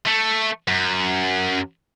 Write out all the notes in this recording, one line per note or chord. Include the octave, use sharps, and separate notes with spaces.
A3
F#2